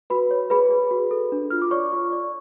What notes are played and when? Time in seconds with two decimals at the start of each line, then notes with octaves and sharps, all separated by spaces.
0.10 F#4 B4 B5
0.31 C#5
0.50 G#4 B4 B5
0.71 G#4
0.91 F#4
1.11 A4
1.32 D4
1.50 F4 F6
1.62 D6
1.71 C#5 D5 C#6
1.93 F4
2.12 D5